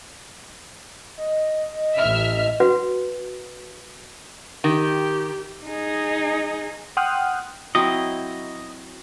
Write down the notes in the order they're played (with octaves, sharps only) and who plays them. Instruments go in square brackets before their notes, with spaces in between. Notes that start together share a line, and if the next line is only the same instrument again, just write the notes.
[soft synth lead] D#5
[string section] A1 E5 F6
[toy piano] F#4 B4 F#5
[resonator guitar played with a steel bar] D#3 [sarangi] G4
[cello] D#4 G#4
[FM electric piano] F#5 G5 C6 D#6 F6 F#6
[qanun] F#3 C4 E4 [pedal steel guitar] D#5